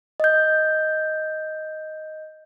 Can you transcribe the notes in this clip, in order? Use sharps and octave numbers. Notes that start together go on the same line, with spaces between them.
D#5 G6